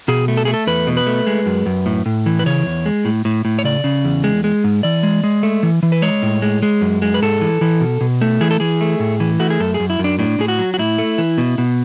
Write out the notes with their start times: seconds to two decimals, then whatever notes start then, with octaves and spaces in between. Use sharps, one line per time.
0.08 B2 G#4
0.28 A3
0.37 A4
0.45 A3 G#4
0.54 A4
0.67 E2 B4
0.87 B2
0.97 B4
1.07 A3
1.27 G#3
1.46 F#2
1.66 F#2
1.86 A2
2.06 A2
2.26 E3
2.39 B4
2.46 C#3 C#5
2.66 E2
2.86 G#3
3.05 A2
3.25 A2
3.45 A2
3.59 C#5
3.64 C#3 D5
3.84 C#3
4.05 E2
4.24 G#3
4.44 G#3
4.64 G#2
4.83 E3 D5
5.03 G#3
5.24 G#3
5.43 A3
5.63 E3
5.83 E3
5.92 B4
6.02 G#3 C#5
6.23 A2
6.42 G#3
6.62 G#3
6.81 F#2
7.02 G#3
7.14 B4
7.22 G#2 A4
7.41 E3
7.61 E3
7.81 B2
8.01 B2
8.21 A3
8.41 E3 G#4
8.51 A4
8.60 E3 G#4
8.81 A3
9.00 A2
9.20 E3
9.40 A3 F#4
9.50 G#4
9.60 F#2 A4
9.74 G#4
9.80 F#2
9.90 E4
9.99 F#2
10.04 D4
10.19 A2 D4
10.39 A2 G#4
10.48 F#4
10.59 F#3
10.74 F#4
10.79 A2 E4
10.98 A3
11.18 E3
11.38 B2
11.58 B2